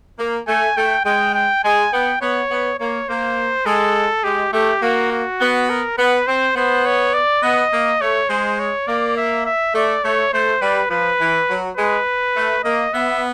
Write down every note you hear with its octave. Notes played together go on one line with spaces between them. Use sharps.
A#3
A3 G#5
A3 G5
G#3 G5
G5
G#3 G#5
B3 G5
B3 C#5
B3
A#3 C#5
A#3 C5
G#3 A4
G#3 G4
A3 G4
A#3 F#4
F#4
B3
A#4
B3 B4
C4 C5
B3 C5
C#5
D5
B3 D#5
A#3
A3 C#5
G#3 C5
C#5
A#3 D5
E5
E5
A3 D5
A3 C#5
A3 C5
G3 B4
F3 B4
E3
F#3
G#3 B4
A3
A#3 D#5
B3 E5